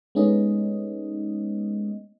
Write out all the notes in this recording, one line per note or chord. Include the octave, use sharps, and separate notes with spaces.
G#3 A3 B3 C#4 D#4 D#5